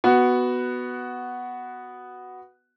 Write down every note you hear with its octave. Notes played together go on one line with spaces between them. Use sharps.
B3 F#4